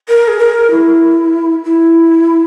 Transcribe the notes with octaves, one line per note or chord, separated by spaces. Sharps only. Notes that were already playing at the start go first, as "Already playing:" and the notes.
A#4
G#4
A#4
E4
E4